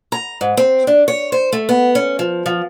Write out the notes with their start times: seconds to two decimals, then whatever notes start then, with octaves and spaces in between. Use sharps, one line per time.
0.12 A#5
0.41 G#2
0.57 C4
0.87 D4
1.08 C#5
1.32 C5
1.53 A3
1.69 B3
1.95 C#4
2.19 F3
2.46 F3